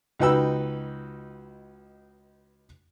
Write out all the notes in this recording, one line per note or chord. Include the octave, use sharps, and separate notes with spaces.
C#2 D#4 F#4 B4 G5 E6